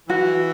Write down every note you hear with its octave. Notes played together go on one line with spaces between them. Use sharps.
E3 F#4